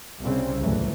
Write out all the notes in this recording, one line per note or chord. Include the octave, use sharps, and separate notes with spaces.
C2 C#3 G3 C4
G1 D2 A#2 E3 F#3 A3